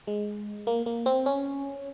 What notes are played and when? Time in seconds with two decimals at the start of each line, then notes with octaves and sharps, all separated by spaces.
0.07 G#3
0.67 A#3
0.86 A#3
1.06 C4
1.26 C#4